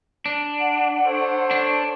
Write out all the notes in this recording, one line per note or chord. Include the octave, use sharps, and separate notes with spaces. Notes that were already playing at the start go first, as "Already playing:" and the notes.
D4
F#5
A4 C5 C#5
D4